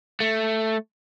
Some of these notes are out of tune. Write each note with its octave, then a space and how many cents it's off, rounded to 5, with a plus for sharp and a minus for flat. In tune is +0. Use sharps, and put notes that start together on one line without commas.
A3 +5